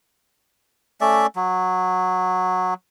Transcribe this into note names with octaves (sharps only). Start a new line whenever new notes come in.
A3 C#4 D5 E5
F#3